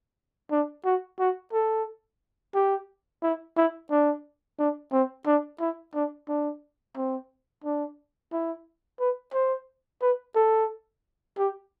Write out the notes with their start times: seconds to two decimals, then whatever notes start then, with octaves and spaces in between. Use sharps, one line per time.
0.51 D4
0.85 F#4
1.19 F#4
1.53 A4
2.55 G4
3.23 E4
3.57 E4
3.91 D4
4.59 D4
4.92 C4
5.26 D4
5.60 E4
5.94 D4
6.28 D4
6.96 C4
7.64 D4
8.32 E4
9.00 B4
9.34 C5
10.02 B4
10.35 A4
11.38 G4